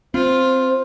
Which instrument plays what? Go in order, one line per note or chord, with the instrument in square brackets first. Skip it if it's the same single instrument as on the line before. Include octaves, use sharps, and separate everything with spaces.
[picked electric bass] C4 [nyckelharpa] F4 [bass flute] C5